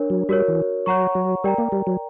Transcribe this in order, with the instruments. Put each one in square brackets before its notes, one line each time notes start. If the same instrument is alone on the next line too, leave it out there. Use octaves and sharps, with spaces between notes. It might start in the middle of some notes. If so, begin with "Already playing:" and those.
Already playing: [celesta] D4 A#4 C#5
[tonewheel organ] F#3
[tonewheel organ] G3 [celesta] F#4 A#4 C#5
[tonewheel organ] E3
[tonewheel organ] F#3 [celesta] C#5 F#5 A#5 C#6
[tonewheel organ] F#3
[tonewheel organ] G3 [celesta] A#4 D5 G5 A#5
[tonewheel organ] A#3
G3
F#3